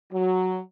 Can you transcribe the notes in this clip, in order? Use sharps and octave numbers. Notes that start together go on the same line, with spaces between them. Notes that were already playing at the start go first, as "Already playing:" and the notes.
F#3